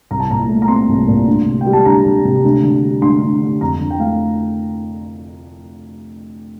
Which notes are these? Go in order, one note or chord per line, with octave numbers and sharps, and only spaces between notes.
C2 A#5
A5
A#2 A#5
A3
A#5
C4 C6
C2
A#2
D2
C3
G5
G3
A5
D2 A#5
D2
C3
D2
D3
G3
D2 C6
D2
D3
F2 A#5
D3
G5
A3 F5